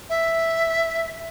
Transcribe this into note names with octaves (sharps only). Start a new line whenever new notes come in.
E5